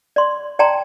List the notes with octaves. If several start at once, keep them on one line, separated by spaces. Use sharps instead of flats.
D5 C6
D5 G5 A5 A#5 C6